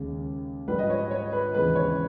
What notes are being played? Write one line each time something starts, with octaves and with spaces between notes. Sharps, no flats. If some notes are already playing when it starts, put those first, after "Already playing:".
Already playing: D#2 C#3 G#3
A#1 G#2 G3 B4
D#5
C#5
C#5
B4
D#2 C#3 E3 G#3 B3 B4
C#5